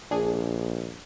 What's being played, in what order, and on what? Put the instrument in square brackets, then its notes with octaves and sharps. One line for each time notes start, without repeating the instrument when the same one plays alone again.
[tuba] A#1 [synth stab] D4 G#4